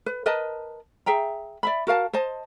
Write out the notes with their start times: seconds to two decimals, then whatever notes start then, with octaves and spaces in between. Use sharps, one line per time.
0.06 B4
0.26 A#4 B4 D#5 A5
1.06 G#4 E5 G5 A#5
1.63 D5 E5 B5
1.87 F#4 A#4 F5 A5
2.13 C5 D#5 A5